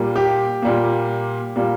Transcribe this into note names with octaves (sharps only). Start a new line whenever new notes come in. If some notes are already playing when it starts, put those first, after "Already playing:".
Already playing: A#2 G3 A#3
G4
A#2 G3 A#3
A#2 G3 A#3